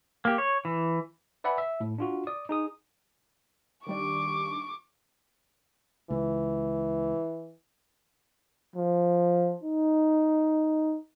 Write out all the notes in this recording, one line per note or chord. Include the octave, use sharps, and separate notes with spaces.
A#3 G4
C#5
E3
B4 D5 E5 F#5 G#5 B5
E5
A2
D4 F4 F#4
D5 D#6
D#4 G#4 D#6
D#3 G3 D4 C#6 D6
C#2 E3
F3
D#4